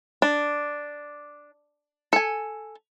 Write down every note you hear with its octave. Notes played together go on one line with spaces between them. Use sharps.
D4
A4 G#5